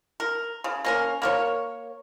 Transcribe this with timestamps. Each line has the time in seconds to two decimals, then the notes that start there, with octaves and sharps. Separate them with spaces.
0.20 A#4
0.64 C#3
0.85 A#3 C#4 A#4
1.22 A#3 A#4 C#5